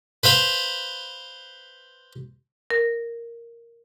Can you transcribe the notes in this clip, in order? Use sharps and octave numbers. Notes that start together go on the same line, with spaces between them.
B4 C5 F5 B5
A#4